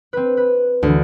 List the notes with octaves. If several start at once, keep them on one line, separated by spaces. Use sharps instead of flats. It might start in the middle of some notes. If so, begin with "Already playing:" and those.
C4 B4
B4
D2 E3